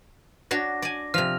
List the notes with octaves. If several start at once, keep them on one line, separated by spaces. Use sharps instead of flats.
D4 F#4 C#5 A#6
D5 G#5
C3 F3 F6 F7